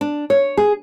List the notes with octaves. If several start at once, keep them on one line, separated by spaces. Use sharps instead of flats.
D4
C#5
G#4